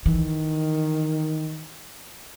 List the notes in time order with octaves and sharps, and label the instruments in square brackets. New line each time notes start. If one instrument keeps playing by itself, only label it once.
[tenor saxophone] D#3 [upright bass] E3